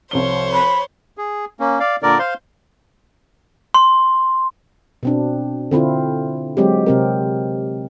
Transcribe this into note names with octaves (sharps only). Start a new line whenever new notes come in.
C2 F3 C5 C#5 G7
B5
G#4
A#3 C#4
D5 F5
A#2 D3 A#4 D5
C5 F5 C6
C6
B2 C4 D4
D3 C4 E4 F4
F#3 G#3 C4 G4
C3 C4 A#4